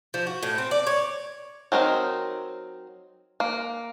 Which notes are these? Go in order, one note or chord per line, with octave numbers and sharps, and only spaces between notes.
F3
F#4
A2
C4
D5
C#5
F#3 C4 D#4 A#4
A#3